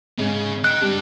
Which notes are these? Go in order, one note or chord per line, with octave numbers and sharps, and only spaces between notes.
G#2 C#3 C#4
D#5 G5 F#6
G3 D4 G5